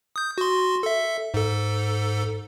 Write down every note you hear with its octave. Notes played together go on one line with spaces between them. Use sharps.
D#6 G6
F#4 C6
A4 E5
G#2 A4